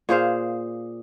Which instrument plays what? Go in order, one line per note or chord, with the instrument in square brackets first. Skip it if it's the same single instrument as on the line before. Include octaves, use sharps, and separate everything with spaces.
[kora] A#2 G#4 C5 F5